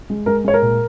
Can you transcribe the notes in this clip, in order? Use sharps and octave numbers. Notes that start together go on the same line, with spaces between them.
G#3
G#3 A#4
G#3 C#5
A#4
A#2